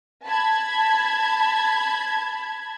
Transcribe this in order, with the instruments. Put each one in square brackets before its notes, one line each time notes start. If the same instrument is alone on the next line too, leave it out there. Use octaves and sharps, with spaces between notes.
[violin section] A5 B5 G#6